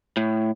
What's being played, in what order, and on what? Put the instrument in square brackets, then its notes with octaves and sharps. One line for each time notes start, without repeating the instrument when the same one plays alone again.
[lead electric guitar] A2